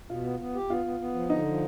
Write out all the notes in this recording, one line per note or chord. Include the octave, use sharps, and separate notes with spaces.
B2 F4
B3
B3
G4
B3 F4
B3
B3
F3
D3 D#4
F3